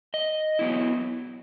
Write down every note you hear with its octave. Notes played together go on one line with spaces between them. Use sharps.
D#5
F#3 B3 E4